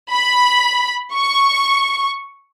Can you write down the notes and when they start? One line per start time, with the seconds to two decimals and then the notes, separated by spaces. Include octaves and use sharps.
0.11 B5
1.12 C#6